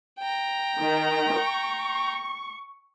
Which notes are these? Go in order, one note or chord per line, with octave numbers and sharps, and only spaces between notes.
G5 A#5
D#3
C#6